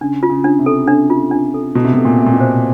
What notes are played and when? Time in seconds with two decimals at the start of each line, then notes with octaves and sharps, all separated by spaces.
0.01 C#3 D4
0.23 F4
0.30 C#3
0.44 D4
0.59 C3
0.66 A4
0.88 D4
1.10 F4
1.31 D4
1.54 A4
1.75 B2 E4
1.85 C3
1.93 B2
1.97 A4
2.05 A#2
2.19 E5
2.26 A#2
2.34 B2
2.40 C5